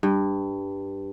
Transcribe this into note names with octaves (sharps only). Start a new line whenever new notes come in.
G2